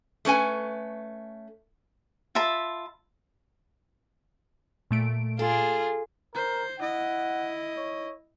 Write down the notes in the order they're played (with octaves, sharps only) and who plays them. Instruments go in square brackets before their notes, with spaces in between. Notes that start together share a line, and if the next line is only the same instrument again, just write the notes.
[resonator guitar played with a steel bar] A3 C#4 B4 G#5
[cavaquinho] F4 E5 A5 B5
[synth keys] A#2 A3 D7
[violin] F4 G#4 [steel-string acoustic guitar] A4
[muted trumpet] A#4 [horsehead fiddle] C5
[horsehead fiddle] E4 D#5 [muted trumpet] F#5
[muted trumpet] C#5